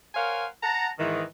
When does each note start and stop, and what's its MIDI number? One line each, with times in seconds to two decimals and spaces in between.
0.15 0.45 70
0.15 0.45 72
0.15 0.45 73
0.15 0.45 77
0.15 0.45 78
0.15 0.45 80
0.62 0.88 78
0.62 0.88 81
0.62 0.88 82
0.99 1.22 44
0.99 1.22 51
0.99 1.22 52